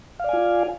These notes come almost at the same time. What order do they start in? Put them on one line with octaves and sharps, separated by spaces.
F5 D5 G#5 F4